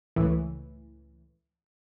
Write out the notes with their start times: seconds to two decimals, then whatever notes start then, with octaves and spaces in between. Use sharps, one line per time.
0.16 C#2 A2 E3